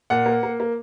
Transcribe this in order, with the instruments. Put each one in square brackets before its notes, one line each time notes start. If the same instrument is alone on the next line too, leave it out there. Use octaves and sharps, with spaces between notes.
[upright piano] A#2 F#5
A#3
A#3
A#3